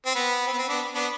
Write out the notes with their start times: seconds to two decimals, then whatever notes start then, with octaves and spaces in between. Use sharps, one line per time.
0.06 C4
0.15 B3
0.47 C4
0.53 B3
0.58 C4
0.68 B3 D4
0.95 B3 D4